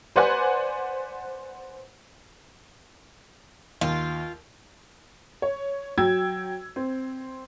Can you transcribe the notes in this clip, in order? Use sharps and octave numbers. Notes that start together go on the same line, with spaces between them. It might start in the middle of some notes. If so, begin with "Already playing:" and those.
B4 C5 D5 F#5 G#5 F#6
D#2 F4
C#5
F#3 G5 E6 G#6
C4